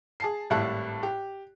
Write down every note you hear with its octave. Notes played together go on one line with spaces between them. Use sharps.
G#4 A5 C7
G#1 A2 G3 E4 A5 F#6
G4